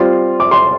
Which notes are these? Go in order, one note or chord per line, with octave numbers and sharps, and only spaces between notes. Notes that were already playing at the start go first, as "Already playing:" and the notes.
Already playing: G3 C4 F4 C6
D6
C6